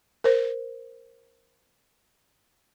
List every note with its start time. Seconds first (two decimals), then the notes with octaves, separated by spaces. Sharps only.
0.24 A#4 C5